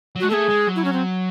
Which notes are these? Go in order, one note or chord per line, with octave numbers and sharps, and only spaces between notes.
F#3
G#3 F#4
A3 G#4 A4
G#3
F#3
E4
C#4
C4